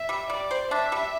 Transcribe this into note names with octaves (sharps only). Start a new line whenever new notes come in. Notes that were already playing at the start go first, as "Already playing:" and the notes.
Already playing: E5
G3
G3 D5
C5
D4 E5
G3